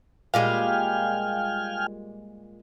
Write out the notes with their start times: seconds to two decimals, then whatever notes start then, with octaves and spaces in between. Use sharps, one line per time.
0.34 A#2 G3 G#3 F5 G5 G#5 F6